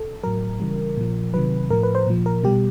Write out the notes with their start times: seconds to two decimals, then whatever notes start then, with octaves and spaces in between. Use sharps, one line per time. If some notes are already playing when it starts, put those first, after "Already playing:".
Already playing: A4
0.23 A2 F#3 A#4
0.60 C#3 E3 G3
0.96 A#2 F3
1.34 C3 D#3 F#3 B4
1.70 A2 F3 A#4
1.83 B4
1.95 C5
2.07 A#2 F3
2.26 A#4
2.44 B2 G3 G4